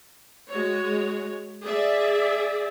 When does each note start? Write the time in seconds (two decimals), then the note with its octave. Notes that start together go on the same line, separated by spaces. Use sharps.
0.48 G#3 F#4 C#5
1.63 G#4 D5 E5